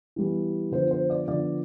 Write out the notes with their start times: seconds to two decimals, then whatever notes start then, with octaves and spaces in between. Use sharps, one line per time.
0.16 E3 G3 B3
0.72 D3 F3 B3 C5
0.91 C5
1.10 D5
1.28 D3 F3 B3 D5